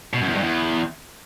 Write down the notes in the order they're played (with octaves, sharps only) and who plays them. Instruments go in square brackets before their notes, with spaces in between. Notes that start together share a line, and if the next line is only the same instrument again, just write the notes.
[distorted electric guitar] B2
F#2
E2
G2
E2